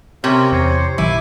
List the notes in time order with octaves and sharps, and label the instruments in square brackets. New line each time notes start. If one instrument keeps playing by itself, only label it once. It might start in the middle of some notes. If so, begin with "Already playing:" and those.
[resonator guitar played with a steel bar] C3 [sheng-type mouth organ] C#4 A#4 G5
[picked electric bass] E2 [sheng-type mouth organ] C5 C#5
[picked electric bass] A#1 D#3 F#3 [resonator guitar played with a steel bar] E4 [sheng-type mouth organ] G#5 D6